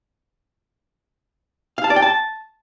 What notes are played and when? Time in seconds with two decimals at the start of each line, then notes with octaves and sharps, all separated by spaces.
1.78 F5
1.84 A5
1.90 D5
1.96 G5
2.02 A5